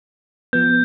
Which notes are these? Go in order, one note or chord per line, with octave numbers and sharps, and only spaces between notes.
F3 B3 G6